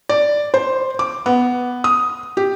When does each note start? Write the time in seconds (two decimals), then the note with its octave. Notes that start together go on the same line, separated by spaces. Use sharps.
0.09 D5
0.54 C5
0.99 D6
1.26 B3
1.84 D#6
2.37 G4